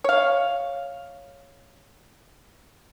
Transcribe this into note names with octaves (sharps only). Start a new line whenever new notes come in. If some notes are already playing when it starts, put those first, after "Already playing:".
C#5 F5